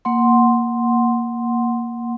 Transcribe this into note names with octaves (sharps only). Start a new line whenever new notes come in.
A#3 F#5 C6